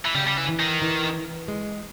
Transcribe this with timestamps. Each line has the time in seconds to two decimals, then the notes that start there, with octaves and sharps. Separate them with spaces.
0.05 E3
0.15 C#3 G3
0.27 G3
0.38 E3
0.49 E3
0.60 D#3
0.82 E3
1.48 G#3